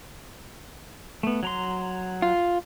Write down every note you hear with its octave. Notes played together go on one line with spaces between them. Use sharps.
A3 B3
F#3 A#5 C6
F4